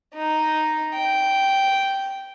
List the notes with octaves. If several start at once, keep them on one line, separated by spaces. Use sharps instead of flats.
D#4
G5